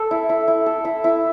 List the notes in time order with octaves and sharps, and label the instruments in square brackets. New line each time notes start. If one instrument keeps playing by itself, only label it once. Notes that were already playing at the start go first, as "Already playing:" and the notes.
Already playing: [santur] A4
E4
E4
E4
A4
E4
E4